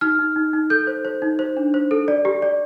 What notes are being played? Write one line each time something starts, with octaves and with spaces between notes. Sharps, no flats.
D#4 F6
D#4
D#4
D#4
A4 G6
C5
C5
D#4
C5
D4
C5
A4
D5
G4
D5